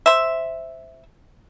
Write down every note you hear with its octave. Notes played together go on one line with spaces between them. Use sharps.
C5 E5